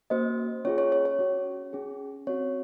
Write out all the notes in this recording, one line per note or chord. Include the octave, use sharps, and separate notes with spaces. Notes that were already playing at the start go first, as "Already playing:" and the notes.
A#3 C#4 F#4 C5 D#5
C#4 F4 G#4 C#5
C#5
C#5
C#5
C#4 F#4
C#4 G#4
C4 F#4 C#5